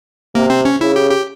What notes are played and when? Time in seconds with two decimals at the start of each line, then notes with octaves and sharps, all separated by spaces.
0.35 C3 A#3
0.50 C4
0.65 C#4
0.81 C#3 E4
0.96 G4
1.11 G4